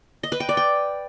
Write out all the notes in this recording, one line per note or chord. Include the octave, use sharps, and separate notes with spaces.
D#5
B4
G5
D5
G5